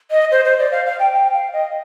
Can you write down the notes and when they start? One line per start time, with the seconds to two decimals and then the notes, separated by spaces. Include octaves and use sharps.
0.11 D#5
0.31 C5
0.45 C5
0.59 D5
0.72 F5
0.86 F5
0.99 G5
1.13 G5
1.34 F5
1.53 D#5